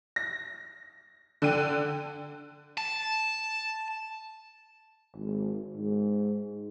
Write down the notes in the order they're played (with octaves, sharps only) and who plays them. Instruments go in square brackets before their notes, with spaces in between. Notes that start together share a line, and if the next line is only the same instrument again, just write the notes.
[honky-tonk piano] A#6
D3 G5 D#7
[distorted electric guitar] A5
[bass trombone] G#1
G#2